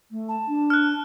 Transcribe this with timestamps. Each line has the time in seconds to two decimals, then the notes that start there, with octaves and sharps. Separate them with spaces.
0.11 A3
0.29 A5
0.48 D4
0.70 F6 F#6